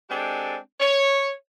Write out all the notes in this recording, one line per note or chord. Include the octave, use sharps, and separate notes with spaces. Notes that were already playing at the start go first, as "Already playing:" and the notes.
G#3 C4 D4 G4 A4 G#5
C#5